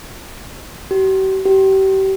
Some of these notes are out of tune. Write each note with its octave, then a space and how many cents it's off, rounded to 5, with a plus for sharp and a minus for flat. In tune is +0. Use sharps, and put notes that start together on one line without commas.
G4 -45
G4 -35